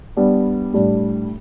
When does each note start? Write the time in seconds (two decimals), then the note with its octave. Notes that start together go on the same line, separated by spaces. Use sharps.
0.17 G3 B3 D4
0.74 A2 G3 D4